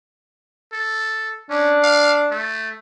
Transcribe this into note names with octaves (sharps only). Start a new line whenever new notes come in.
A4
C#4 D4
F5
A3